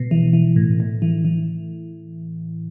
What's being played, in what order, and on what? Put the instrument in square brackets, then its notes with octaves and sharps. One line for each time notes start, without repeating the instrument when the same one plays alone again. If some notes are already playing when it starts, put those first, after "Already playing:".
Already playing: [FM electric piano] B2
E3
E3
A2
A2
E3
E3